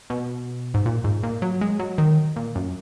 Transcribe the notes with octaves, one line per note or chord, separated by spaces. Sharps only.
B2
G#2
A#2
G#2
A#2
F#3
G#3
F#3
D#3
A#2
F#2